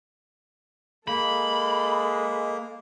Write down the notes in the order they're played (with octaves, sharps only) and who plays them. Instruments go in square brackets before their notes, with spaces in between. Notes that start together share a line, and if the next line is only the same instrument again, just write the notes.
[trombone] G#3 [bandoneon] A#3 [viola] A4 [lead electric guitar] B5